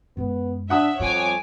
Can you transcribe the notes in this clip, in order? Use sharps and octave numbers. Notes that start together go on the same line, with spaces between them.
F#2 G#3 B3
D4 E5 F#5 D#6
F2 G3 C#5 G#5 D6